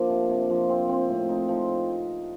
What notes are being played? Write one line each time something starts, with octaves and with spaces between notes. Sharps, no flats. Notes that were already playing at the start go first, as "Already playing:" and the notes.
Already playing: F3 A#3 D4
C3
C3
F3
C4
C4
A2
D#4
F3